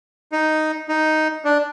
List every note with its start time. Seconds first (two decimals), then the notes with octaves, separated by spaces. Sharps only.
0.32 D#4
0.88 D#4
1.45 D4